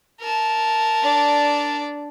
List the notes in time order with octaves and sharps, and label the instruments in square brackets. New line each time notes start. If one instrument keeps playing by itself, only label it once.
[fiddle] A#4 A5
[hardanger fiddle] D4 D5